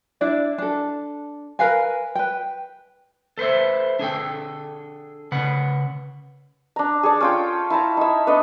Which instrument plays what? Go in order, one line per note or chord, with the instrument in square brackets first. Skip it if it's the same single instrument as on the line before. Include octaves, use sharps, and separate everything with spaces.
[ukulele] D4 E4 D5
D4 A4
A#4 B4 F5 G#5
B4 G5
[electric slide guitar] A4 B4 C5 E5
D4 G#4 A4 G5
C#3 B4 F#5
[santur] D4 A#5
G#4 A4 D5
C#4 F4 G5
E4 A5 A#5
D#4 E5
B3 D4 A4 D#5